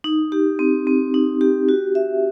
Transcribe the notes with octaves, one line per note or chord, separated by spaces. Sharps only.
D#4
G4
C4
C4
D#4
G4
F#4
E5